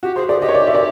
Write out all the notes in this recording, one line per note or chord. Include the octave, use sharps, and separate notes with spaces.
F#4 G4
G#4 C5
G#4 D5
G4 D#5
C#5
D5
E5
D5